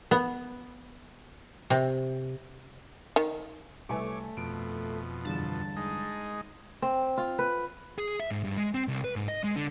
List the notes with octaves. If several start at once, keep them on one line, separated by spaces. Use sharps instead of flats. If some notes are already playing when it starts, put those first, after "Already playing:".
B3
C3
D#3
C2 A3 B4 C#5 G#5 D6
F2 B2 D7
G1 E2 A5
G#3 D#4
C4
F4
B4
G#4
E5
G#2
G2
G#3
C4
C2
B4
G#2
D#5
G#3
D3